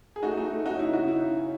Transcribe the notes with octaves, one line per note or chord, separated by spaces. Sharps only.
G#4
A3 D#4 F#4
A3 D#4
A3
C#4 D#4 F#4
C#3 E4
C#3 D#4 F#4
D#4 E4
C#3
C#4